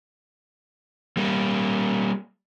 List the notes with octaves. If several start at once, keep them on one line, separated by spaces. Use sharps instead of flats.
G3 A#3